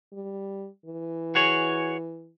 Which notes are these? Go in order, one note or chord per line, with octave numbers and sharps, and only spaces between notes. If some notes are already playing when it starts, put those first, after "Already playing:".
G3
E3
F#4 G#4 C#5